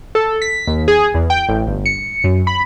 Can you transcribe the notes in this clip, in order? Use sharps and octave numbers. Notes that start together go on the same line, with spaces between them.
A4
B6
D#2
G#4
E2
G5
A1
G1
C#7
F#2
B5